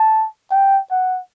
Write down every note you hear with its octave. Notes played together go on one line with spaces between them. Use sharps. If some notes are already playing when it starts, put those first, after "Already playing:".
Already playing: A5
G5
F#5